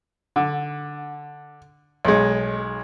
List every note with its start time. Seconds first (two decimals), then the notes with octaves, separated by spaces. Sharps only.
0.36 D3
2.05 B1 G#3